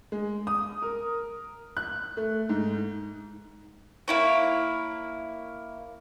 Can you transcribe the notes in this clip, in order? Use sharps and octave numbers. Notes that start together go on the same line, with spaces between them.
G#3
D#6
A#4
F#6
A3
G#2
A#3 E4 C#5